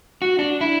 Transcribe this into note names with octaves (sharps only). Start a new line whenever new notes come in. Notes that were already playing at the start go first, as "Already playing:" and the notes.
F#4
D4
E4